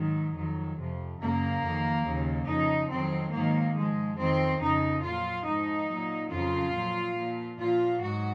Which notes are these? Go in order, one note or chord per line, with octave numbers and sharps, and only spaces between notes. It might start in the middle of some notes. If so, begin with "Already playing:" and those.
Already playing: G#2 D#3 F#3
F2 D#3 F#3
F2 C3 F3
F#2 C#3 F#3 A#3
F2 D#3 F#3
D#2 C#3 F#3
F2 C#3 F3 D#4
F2 D#3 F#3 C4
G#2 D#3 F#3 A#3
G#2 F3 G#3
F2 D#3 F#3 C4
F2 C#3 F3 D#4
A#2 F#3 F4
G#2 F3 D#4
A#2 F#3
F2 C#3 F#3 F4
A#2 F#3
A#2 F3
A#2 F3 F4
G#2 F#3 F#4